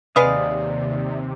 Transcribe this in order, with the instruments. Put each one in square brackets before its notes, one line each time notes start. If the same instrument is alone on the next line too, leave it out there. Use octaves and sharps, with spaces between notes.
[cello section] D#2 [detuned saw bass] C3 [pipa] G#3 B4 F5 [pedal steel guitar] D5 D#6